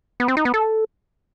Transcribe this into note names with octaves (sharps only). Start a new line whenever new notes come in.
B3
C4
D#4
B3
A4